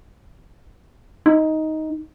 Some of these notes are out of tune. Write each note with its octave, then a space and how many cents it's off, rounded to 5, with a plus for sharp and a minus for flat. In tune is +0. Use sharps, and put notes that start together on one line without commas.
D#4 +10